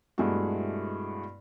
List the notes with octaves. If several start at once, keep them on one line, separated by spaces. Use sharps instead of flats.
G2 B2 G#3 A3 E4 F#4